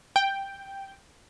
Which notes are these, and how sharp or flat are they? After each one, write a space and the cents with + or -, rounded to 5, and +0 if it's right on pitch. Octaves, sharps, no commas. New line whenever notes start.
G5 +0